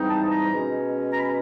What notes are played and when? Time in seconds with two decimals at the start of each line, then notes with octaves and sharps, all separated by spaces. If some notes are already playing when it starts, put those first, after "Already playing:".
Already playing: G#2 E3 G3 C4 D#4
0.09 A5
0.31 A#5
0.52 B2 G#3 C#4
1.13 A#5
1.19 B5